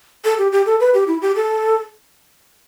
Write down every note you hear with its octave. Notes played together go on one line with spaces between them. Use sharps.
A4
G4
G4
A4
B4
G4
E4
G4
A4